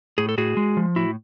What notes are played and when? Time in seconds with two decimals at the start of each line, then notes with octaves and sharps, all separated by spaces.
0.18 A2 G#4
0.29 A4
0.38 A2 F#4 G#4
0.57 G#3
0.77 F3
0.96 A2 E4 F#4